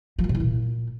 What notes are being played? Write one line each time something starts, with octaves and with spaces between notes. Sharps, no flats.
F3
F#2
C3
E3
A#2